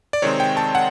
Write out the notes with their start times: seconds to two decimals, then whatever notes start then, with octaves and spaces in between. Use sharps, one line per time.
0.13 D5
0.22 C3 D#3 G#3 C4 C#5
0.40 G5
0.57 A5
0.75 F#5